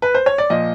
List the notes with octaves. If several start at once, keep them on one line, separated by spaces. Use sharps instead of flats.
B4
C5
C#5
D5
A#2 F3 D#5